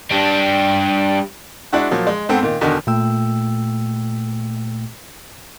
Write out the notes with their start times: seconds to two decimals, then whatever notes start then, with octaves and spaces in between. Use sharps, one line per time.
0.11 G3 D4
1.73 G#3 D4 E4 F#4
1.91 A#2 F3 F#3
2.07 G#3
2.29 G#2 B3 C4 A4
2.43 A#2 D#3
2.61 E2 B2 D3 D#3
2.87 A#2 A3 G5 E6